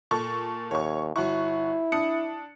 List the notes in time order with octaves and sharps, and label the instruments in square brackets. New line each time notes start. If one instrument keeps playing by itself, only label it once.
[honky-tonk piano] A#2 A4 C#6
[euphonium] D#2 [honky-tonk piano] C#5 C#6
[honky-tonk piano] G1 F#4 C#6 [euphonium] E4
[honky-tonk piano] D4 D#6 C#7